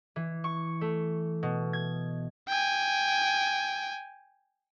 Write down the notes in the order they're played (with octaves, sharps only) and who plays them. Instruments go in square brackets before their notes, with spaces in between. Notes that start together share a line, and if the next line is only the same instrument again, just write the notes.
[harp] E3
C#6
A3
B2
G#6
[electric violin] G5 G#5